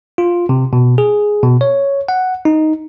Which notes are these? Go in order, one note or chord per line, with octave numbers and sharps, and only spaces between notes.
F4
C3
B2
G#4
B2
C#5
F#5
D#4